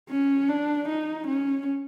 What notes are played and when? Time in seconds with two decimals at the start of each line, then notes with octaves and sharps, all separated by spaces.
0.10 C#4
0.49 D4
0.88 D#4
1.27 C#4